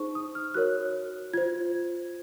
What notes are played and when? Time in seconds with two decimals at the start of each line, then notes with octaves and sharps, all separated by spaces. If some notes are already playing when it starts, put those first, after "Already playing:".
Already playing: D#4 G#4 C5 C#6
0.15 D#6
0.35 F6
0.54 F#4 A#4 C#5 F#6
1.33 F4 C5 G#6